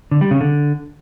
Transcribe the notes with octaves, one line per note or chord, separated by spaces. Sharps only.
D3
G3
C#3
D3